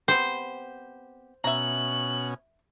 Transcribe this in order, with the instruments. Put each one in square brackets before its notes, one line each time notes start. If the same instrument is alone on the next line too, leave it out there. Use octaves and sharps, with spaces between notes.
[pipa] B3 C4 G4 [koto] C5
[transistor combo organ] B2 C#4 [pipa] E5 A#5 [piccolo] F#7